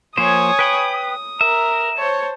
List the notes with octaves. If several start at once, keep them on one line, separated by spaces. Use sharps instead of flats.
F3 A#3 C5 C#5 G#5 D#6
B4 G5 B5
D#6
A#4 E5
C5 C#5 A5